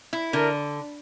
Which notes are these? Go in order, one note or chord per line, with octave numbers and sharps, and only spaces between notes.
E4
D3 A#4